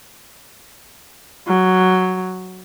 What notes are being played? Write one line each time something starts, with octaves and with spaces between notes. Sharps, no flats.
F#3